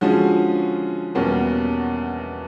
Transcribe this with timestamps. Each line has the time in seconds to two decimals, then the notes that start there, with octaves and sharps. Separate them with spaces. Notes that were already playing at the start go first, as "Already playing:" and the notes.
0.01 D3 F3 G#3 C#4 F#4
1.15 E2 B2 G3 A#3 C#4